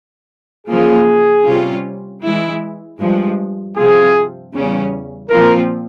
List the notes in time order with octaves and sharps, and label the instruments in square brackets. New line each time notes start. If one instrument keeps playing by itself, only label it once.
[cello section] C#3 F3 A#3 F4 [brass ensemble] G#4
[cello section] C3 G3 C#4 F4
E3 G#3 E4
G2 F3 G#3
[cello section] C3 F3 C4 F4 [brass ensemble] G#4
[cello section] E2 C#3 G3 C#4
[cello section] A#2 F3 C4 F4 [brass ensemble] A#4